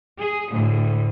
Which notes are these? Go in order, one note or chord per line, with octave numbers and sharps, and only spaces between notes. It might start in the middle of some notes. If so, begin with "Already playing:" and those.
G#4
D2 A2